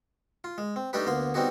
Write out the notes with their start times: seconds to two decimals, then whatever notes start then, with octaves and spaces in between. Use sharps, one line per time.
0.44 F4
0.58 G#3
0.76 C4
0.93 G3 A3 D4 D#4 G4 B4
1.06 D2 A#3 B3 C6
1.34 G3 B3 C4 D#4 F#4 G#4